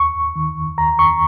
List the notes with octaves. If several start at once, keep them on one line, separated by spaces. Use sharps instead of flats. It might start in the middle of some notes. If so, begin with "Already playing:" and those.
Already playing: D#2 C#6
D#3
D#2 A#5
C#6